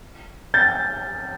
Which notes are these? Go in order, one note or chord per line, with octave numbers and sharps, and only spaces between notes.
G6 A6